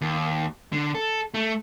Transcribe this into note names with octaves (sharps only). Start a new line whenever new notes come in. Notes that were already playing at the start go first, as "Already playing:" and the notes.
D#2
D3
A4
A3